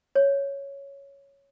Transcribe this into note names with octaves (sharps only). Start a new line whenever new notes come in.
C#5